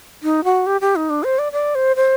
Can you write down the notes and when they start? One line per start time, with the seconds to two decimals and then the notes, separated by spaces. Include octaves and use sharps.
0.23 D#4
0.44 F#4
0.66 G4
0.81 G4
0.96 D#4
1.10 D4
1.24 C5
1.39 D5
1.52 D5
1.75 C5
1.96 C5